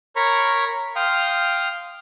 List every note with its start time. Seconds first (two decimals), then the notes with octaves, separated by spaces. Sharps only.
0.16 A#4 C#5 A#5 B5 C#6
0.96 F5 G5 C6 D#6 F6